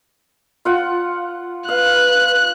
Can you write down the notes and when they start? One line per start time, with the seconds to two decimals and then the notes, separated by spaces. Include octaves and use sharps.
0.65 F4 F#5
1.69 B4 F5 F#6